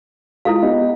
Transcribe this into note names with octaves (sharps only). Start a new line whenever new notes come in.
G#3 E4 F4 A4 F5
B3 D#4 G4